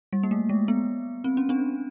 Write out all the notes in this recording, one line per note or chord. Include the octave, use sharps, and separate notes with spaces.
G3
A#3
A3
G#3
B3
C4
C#4
C4 D4